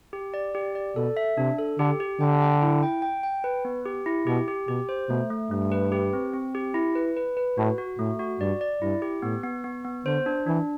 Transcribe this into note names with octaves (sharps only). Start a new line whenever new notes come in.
G4
D5
G4
D5
B2 A4
E5
C3 D4
A4
D3 G4
G4
D3 G5
G5
E4
G5
G5
G5
B4
B3
G4
E4
B2 G4
G4
B2 G4
C5
B2 A3
A3
G2 A3
B4
G4
C4
C4
G4
E4
B4
B4
B4
A2 F#4
F#4
A2 A3
F#4
G2 D5
D5
G2 E4
G4
A2 B3
B3
B3
B3
D3 C5
D4
E3 D4